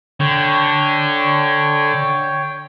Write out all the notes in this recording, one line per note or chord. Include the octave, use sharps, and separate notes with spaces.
D3 C#5 G5